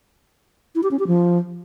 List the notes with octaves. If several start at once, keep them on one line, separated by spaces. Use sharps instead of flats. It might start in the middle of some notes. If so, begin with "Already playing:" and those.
E4
G4
C#4
G4
F3